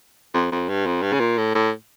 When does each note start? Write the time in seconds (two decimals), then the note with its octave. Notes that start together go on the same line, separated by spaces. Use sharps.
0.34 F2
0.52 F2
0.69 G2
0.86 F2
1.02 G2
1.13 C#3
1.20 A#2
1.38 A2
1.55 A2